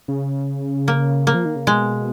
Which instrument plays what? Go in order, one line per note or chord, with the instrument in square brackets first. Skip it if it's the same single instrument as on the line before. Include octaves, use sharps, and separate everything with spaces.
[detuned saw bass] C#3
[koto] A#3
A#3
[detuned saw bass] F3
D#3
C#3
[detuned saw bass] B2 [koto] G#3